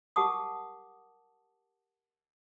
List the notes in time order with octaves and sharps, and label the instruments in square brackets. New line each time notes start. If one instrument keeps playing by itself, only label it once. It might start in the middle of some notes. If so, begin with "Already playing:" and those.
[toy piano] G4 A#4 F#5 A5 D6 D#6